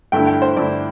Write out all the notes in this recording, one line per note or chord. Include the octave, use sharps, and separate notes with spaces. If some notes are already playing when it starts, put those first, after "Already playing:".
G2 D3 A3 E4 G5
G5
C5
G2 D3 A3 E4 D5